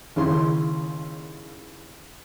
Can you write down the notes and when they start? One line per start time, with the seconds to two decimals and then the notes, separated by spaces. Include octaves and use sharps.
0.16 D#2 C#3 E4 C6